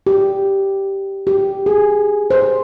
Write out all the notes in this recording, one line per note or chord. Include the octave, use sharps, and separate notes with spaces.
G4
G4
G#4
C5